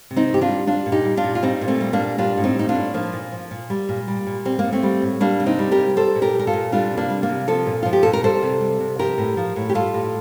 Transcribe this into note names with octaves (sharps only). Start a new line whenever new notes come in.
C3
C4 D#4
D#3 G4
D4 F4
G3
G3 D4 F4
A#2
D#4 G4
G3
D4 F4
A#2
F4
G3 C4 D#4
A#2
A3 C4
G3
A#3 D4
A#2
G3 D4 F4
A2
C4 D#4
G3 D#4
D4 F4
A2
F3 A#3
A#2
F3
A#2
G3
A#2
G3
A#2
G3 C4
A#3
A2
A3 C4
G3
A2
G3 A#3 D4
C3
C4 D#4
G3
G4 A#4
C3
G3 A4 C5
A#2
G4 A#4
G3 A#4
F4 A4
A#2
G3 D4 F4
C3
A#3 D4
G3
A#3
C3
F3 F4 A4
A#2
F3 F4
G4
A#2 A4
A#4
G3 A4 C5
C3
G3
C3
F3 G4 A#4
A2
F3
A2
G4
G3 F4 A4
A2